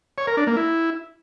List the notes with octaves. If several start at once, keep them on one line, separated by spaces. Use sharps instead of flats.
C#5
A#4
D4
A#3
E4